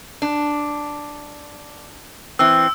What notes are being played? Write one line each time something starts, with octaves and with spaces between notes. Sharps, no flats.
D4
E3 C4 E6